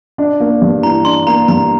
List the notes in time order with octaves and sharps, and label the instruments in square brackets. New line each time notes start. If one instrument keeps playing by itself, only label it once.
[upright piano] D4
A#3
G2
[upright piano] E3 [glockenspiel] A#5
[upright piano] D4 [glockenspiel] C6
[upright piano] A#3 [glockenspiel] A#5
[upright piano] G2 [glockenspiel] A#5